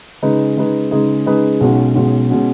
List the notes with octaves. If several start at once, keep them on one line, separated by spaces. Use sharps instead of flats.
C#3 G#3 D#4 G#4 B4
C#3 G#3 D#4 G#4 B4
C#3 G#3 D#4 G#4 B4
C#3 G#3 D#4 G#4 B4
B1 B2 G#3 C#4 F#4
B1 B2 G#3 C#4 F#4
B2 G#3 C#4 F#4